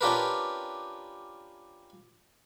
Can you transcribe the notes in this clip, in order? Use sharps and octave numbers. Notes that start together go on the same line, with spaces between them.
C#4 D4 F4 G4 A#4 B4